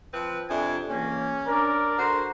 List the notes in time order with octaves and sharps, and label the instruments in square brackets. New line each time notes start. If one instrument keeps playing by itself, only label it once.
[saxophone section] F3 C4 B4
[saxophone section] F2 C3 D4 [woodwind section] G#5
[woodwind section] C#2 E3 A#3 [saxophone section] C#4
[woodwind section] D4 D5 [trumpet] A#4
[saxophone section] D3 F#4 C5 [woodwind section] A#5 C6